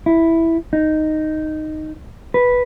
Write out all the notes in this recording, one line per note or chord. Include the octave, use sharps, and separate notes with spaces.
E4
D#4
B4